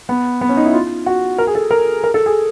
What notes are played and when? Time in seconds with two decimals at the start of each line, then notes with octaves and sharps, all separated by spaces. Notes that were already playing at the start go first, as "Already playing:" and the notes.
0.09 B3
0.41 B3
0.49 C#4
0.57 D#4
0.65 E4
0.73 F4
1.06 F#4
1.38 A#4
1.47 G#4
1.55 A4
1.71 A#4
2.04 A#4
2.14 A4
2.26 G#4